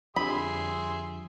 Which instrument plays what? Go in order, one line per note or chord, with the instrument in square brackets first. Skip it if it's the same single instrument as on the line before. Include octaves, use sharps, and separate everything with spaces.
[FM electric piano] F2 D3 G3 [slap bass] F3 [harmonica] G#4 E5 C6 [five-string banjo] B5